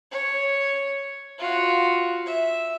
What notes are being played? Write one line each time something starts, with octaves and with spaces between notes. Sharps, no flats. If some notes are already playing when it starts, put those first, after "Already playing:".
C#5
F4 F#4
E5